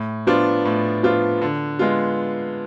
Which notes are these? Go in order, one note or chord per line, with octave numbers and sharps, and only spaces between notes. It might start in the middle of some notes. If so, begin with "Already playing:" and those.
Already playing: A2
F3 B3 D4 F4
A2
F3 B3 D4 F4
D3
G#3 B3 F4